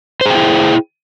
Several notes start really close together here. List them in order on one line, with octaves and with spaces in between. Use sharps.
C5 G#4 G5 E4